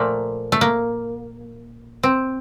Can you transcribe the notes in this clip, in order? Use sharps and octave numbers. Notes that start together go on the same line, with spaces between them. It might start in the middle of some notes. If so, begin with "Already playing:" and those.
Already playing: A#2 F3 A3 A#3
A3
A#3
C4